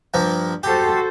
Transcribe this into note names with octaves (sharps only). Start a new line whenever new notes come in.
G2 F3 A#3
F#4 G4 A4 C5